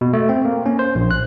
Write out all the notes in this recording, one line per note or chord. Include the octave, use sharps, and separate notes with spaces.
B2
A3
C4
A#3
C#4
C5
A#1
F#6